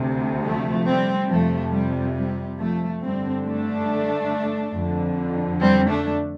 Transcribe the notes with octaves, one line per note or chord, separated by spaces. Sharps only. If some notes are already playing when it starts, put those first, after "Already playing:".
Already playing: D2 C3
F3 A3
G3 C4
F2 C3 F3 A3
G3
G3
F3 A3
G2 D3 G3 C4
A3 D4
F2 D3
G3 C4
A3 D4